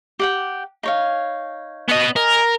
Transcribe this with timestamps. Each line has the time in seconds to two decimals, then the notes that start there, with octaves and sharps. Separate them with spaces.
0.19 G4 F#5 G5
0.83 D#4 C#5 F5
1.89 B3 D#5
2.16 A#4 D#5 G#5